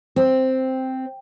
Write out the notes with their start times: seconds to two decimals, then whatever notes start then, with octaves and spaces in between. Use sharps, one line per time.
0.16 C4